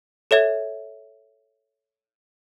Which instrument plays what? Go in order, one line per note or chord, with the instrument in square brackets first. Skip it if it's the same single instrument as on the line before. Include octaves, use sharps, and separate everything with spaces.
[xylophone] A4 C#5 E5 G#6